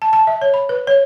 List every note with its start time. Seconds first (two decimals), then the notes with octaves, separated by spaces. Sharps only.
0.02 A5
0.13 A5
0.27 E5
0.42 C#5
0.54 B5
0.69 B4
0.87 C#5